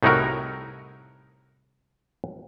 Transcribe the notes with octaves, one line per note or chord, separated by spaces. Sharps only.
C2 A2 D#4 E4 F#4 A#4